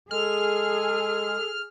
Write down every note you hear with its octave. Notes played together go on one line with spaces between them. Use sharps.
G#3 G#4 A4 F6